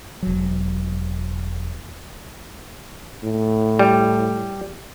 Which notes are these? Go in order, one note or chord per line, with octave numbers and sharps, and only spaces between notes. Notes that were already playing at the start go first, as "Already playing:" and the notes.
E1 F#3
A2
G3